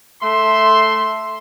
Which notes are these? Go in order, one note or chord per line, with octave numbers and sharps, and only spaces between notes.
A3 A4 E5 C6